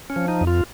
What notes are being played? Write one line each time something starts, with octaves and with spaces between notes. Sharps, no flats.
C#4
F3
D#4
F2
F4